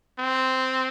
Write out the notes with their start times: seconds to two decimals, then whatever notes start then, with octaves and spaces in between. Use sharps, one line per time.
0.19 C4